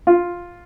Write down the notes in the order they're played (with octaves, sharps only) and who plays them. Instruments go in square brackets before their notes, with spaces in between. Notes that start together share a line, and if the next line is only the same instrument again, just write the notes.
[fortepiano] F4